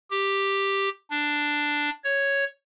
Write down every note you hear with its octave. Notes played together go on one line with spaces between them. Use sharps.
G4
D4
C#5